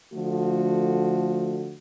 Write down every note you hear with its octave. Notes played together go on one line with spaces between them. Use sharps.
D3 F3 A3 F#4